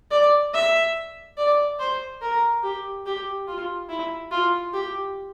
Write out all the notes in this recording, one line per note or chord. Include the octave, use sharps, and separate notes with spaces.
D5
E5
D5
C5
A#4
G4
G4
F4
E4
F4
G4